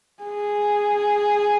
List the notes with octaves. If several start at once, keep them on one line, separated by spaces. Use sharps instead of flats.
G#4